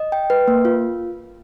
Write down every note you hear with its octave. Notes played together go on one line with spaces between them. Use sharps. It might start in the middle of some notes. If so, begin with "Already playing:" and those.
Already playing: D#5
G5
B4
A#3
F4